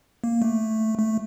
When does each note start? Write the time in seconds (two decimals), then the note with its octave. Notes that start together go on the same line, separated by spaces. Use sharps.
0.24 A#3
0.42 A3
0.98 A3